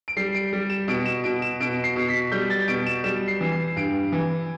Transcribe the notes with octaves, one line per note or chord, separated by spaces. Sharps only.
D7
G3 C7
D7
G3
E7
B2 D7
E7
B2 D7
E7
B2 D7
C7
B2
B6
G3 G6
A6
B2 D7
E7
G3 E7
C7
E3
C7
G2 D7
E3